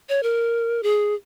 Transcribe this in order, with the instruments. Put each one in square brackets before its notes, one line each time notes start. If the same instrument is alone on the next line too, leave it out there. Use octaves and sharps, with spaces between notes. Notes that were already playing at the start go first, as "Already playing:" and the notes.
[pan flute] C#5
A#4
G#4